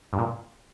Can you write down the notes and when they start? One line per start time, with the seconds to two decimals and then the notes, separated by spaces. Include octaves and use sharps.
0.13 G2
0.19 A#2